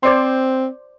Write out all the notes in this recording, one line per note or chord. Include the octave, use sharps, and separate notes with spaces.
C4 C5 D5 C6